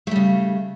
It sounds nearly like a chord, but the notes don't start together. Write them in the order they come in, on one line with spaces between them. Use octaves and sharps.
A3 G3 C#3